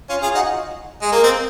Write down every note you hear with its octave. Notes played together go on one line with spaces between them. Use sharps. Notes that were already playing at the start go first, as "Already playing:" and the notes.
C#4 F4
F4 G#4
D#4 F#4
G#3
A#3
C4